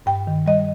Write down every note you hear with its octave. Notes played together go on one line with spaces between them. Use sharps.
G2 G5
D#3
G3 D#5